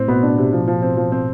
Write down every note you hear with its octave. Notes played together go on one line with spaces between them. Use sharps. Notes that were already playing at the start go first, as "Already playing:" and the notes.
Already playing: A2 C4
B2 B3
D4
C3
F3
F3
C4
F3
C4